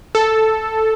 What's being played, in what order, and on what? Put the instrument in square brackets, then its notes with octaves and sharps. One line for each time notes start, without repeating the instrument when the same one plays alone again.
[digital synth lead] A4